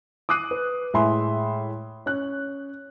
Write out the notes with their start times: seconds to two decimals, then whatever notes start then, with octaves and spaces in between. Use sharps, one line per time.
0.29 D6 D#6 F#6 C7 D#7
0.51 B4
0.94 A2 G#3 E5 G#5 B5 C6
2.06 C#4 F#6